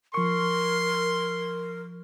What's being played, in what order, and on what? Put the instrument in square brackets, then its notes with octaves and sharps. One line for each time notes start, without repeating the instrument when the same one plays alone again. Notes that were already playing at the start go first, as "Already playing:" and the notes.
[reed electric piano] F3 C#6 [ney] A#4 [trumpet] C6